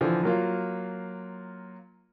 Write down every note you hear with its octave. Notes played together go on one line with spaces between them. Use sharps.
D3 E3 F3
F#3 A#3 F4